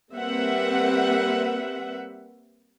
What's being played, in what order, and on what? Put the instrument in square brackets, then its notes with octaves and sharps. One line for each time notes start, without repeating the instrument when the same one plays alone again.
[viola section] G3 A#3 C4 B4 E5 F#5